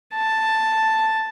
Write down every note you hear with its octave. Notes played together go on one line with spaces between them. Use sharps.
A5